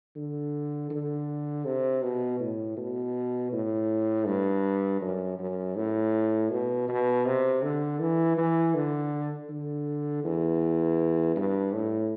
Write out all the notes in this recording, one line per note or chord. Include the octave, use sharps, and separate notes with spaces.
D3
D3
C3
B2
A2
B2
A2
G2
F#2
F#2
A2
B2
B2
C3
D3
E3
E3
D3
D3
E2
G2
A2